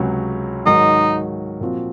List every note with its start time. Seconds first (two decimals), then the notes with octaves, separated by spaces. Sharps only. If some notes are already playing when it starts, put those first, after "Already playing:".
Already playing: C#2 C3 F#3 C#4 G#4
0.66 G#2 D#3 F#3 D#4
1.60 A#2 F3 C4 F#4